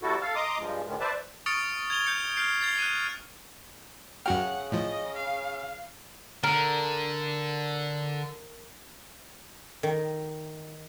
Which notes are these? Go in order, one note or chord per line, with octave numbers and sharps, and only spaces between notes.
C3 G3 E4 F#4 A4
A4 F5
D#5 A#5 C6 D6 D#6
G2 F3 G#3
D2 A2 D#3 G#3
B4 C5 D5 E5 A5
C#6 D#6 F6 A6 C#7 D7
G#6 F7 G7
G6 C#7
F6 G6 C7 D7
G#6 A6 C7
F#6 D#7
F#2 C#3 F#4 F#5 G5 F6
A2 F3 D#5
F5
D3 A#4
D#3